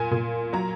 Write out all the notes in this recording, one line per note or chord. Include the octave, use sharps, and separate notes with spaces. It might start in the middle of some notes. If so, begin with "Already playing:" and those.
Already playing: A#2 G#5
A#2
F#3 A#5